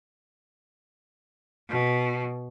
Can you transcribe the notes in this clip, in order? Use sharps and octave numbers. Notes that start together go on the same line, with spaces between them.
B2